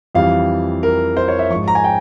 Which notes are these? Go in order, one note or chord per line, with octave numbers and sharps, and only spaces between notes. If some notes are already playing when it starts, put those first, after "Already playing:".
F2 E3 G3 F5
A#4
C5
C#5
E5
G#2 F3 C#6
A#5
G#5
G5